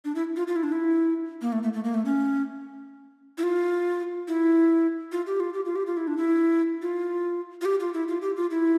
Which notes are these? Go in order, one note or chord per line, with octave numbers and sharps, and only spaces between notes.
D4
E4
F4
F4
E4
D4
E4
A#3
A3
A3
A3
A#3
A3
C#4
E4
F4
E4
F4
G4
F4
G4
F4
G4
F4
E4
D4
E4
F4
F4
G4
F4
E4
F4
G4
F4
E4